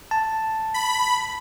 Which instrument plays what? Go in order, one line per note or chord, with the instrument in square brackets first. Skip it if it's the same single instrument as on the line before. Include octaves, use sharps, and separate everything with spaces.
[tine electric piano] A5
[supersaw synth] B5